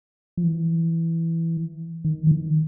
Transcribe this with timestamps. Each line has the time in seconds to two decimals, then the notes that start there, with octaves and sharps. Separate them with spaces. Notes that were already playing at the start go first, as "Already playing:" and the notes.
0.37 F3
0.44 E3
2.05 D#3
2.27 E3
2.31 D#3